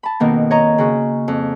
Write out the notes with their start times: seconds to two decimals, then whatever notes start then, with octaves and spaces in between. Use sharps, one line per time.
0.03 A5 B5
0.20 F2 B2 D#3 A#3
0.51 C#5 D#5 A#5
0.78 C#3 F#4 D#6
1.28 F2